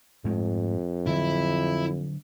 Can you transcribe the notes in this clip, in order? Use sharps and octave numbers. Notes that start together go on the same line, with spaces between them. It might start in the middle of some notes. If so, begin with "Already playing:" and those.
F2 G#2 G#3 A3
D3 F#3 E4